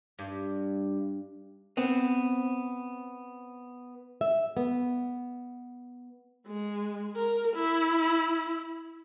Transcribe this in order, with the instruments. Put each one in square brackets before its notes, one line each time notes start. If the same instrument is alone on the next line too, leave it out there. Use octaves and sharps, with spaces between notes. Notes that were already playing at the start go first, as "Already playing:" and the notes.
[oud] G2
[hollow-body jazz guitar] B3 C4
[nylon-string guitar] E5
B3
[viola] G#3
A#4
E4